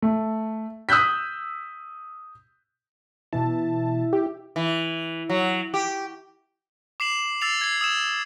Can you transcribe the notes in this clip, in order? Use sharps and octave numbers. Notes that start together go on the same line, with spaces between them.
A3
D#6 E6 F#6 G6 B6
B2 E3 E4 A5
G4
E3
F#3
G4
D6 C7 E7 F#7
E6 A6 C7 F7
G#6 C7
D#6 E6 E7